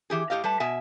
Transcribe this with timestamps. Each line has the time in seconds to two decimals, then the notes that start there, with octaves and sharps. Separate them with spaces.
0.10 E3 G4 G#4
0.30 A2 D#4 G4 D#5 F5
0.44 G3 A3 B4 A5
0.60 B2 E5 G#5